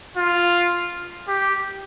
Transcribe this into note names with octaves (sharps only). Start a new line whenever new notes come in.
F4
G4